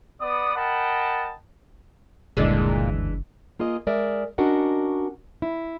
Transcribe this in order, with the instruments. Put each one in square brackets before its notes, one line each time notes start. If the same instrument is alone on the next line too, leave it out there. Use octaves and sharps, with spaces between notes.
[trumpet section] B3 D5 D#6
A#4 D#5 F#5 G5 A5 B5
[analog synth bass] F#1 [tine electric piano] D2 G2 D3 [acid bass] A#2 [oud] E3 G#3 D4
[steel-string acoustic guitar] A#3 F4 G#4 D#5
G#3 A#4 D5 E5
C#4 D4 F#4 A#4 D#5 F#5
E4